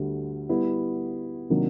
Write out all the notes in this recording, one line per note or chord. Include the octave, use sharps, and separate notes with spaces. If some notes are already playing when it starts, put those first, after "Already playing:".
Already playing: D2 D3 G3
G3 B3 E4
C3 D#3 F#3 A#3 D4